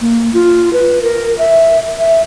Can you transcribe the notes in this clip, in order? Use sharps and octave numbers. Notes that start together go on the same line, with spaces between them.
A#3
F4
B4
A#4
E5
E5